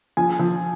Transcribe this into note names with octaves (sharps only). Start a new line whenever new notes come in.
F3 G#5
F3